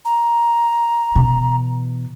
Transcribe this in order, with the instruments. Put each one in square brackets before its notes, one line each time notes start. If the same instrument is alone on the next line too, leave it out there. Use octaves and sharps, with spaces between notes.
[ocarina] A#5
[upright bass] B2 E3